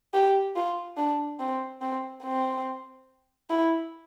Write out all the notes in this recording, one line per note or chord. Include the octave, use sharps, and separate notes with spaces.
G4
F4
D4
C4
C4
C4
E4